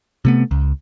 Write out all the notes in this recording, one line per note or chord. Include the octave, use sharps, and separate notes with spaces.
C3 A3 B3
C#2